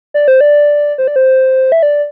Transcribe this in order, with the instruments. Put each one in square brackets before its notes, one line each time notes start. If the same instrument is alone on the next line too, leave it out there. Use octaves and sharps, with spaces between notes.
[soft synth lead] D5
C5
D5
C5
D5
C5
E5
D5